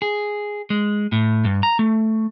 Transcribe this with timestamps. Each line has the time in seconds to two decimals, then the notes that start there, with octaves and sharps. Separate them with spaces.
0.02 G#4
0.70 G#3
1.12 A2
1.45 G2
1.63 A#5
1.79 A3